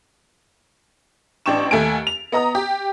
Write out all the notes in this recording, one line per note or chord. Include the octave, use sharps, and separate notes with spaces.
A1 D4 G5 C#6 E7
D#2 A3 G#5 D7
F7
B3 D#5 A#5 D#6
G4